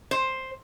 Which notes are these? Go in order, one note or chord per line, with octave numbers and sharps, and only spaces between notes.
C5